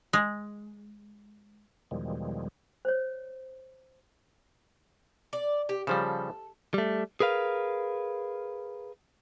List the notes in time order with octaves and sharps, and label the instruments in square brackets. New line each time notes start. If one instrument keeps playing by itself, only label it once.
[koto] G#3
[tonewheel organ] E2 B2 D#3 F3 G3 G#3
[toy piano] C5 C#5
[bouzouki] D5
G4
[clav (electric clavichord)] C#3 F3 G3 [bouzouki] A4
[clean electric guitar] G3 A3
G#4 A#4 B4 F5